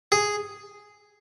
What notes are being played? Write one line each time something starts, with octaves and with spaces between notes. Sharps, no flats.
G#4